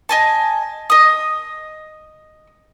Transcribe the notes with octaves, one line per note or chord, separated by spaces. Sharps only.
D#5 G#5 A5
D#5 D#6